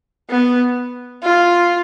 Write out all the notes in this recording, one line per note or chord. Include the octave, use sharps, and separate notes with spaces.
B3
F4